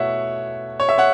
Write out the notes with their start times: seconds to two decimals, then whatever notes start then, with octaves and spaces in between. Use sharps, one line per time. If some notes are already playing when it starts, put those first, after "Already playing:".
Already playing: B2 A3 E4 C#5 E5 F#5
0.80 C#5
0.89 E5
0.98 C#5 F#5